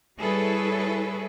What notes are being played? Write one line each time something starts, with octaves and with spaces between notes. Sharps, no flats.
G3 E4 G#4 A4 B4 C#5